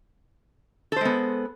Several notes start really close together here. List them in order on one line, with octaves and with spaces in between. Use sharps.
A4 C5 G#3 B3